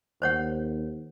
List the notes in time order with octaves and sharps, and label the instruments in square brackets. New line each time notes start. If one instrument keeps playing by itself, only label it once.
[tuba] D#2 [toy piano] C5 C#5 F#5